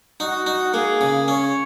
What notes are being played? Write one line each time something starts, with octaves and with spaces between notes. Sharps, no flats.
D#4 F#4
D#4
A#3 G#4
C#3
C#4 C#5